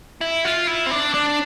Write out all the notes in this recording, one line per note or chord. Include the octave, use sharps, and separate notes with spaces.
E4
F4
E4
C4
D4
D4